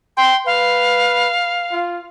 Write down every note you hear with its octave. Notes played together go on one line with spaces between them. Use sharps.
G5 C6
B4 F5
F4